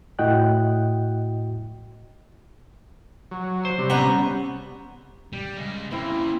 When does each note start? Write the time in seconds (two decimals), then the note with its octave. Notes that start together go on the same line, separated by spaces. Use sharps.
0.19 A2 E4 F#4 D#5 G5 F#6
3.31 F#3
3.65 C5
3.78 C3 G3
3.90 B3 C#4 F#5 A#5
5.33 G3
5.57 C#3 G#3
5.91 C#3 A#3 C4 E4